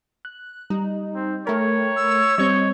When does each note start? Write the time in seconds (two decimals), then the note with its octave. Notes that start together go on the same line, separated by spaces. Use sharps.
0.25 F#6
0.70 G3 D#4
1.15 C4
1.47 A3 A#4 C#5 G5 B5
1.96 E6
2.38 G3 C4 C#5 D#5 C#6 G6